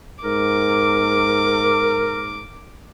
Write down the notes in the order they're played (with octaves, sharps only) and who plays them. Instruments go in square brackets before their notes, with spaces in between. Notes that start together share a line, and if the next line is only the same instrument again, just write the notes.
[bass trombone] G#2 [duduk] A#4 [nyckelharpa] D6